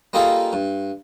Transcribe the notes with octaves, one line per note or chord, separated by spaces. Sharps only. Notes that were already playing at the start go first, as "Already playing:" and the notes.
G3 A#3 D#4 F4 G#4 A4
G2